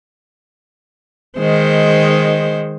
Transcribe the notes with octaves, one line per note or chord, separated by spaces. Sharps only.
D#3 G#3 C5